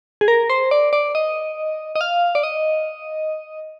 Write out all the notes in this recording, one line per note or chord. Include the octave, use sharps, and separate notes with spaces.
G#4
A#4
C5
D5
D5
D#5
D#5
F5
D5
D#5